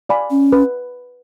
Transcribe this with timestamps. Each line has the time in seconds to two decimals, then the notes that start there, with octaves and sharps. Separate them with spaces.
0.09 D5 F5 G#5 B5
0.31 C#4
0.53 B4